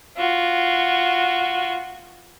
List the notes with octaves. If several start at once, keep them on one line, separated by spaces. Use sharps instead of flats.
F4 F#4